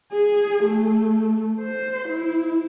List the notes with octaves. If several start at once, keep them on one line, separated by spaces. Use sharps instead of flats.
G#4
A3
C5
E4